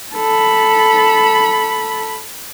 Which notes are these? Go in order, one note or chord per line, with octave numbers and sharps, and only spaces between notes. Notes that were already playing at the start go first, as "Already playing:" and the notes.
A4 B5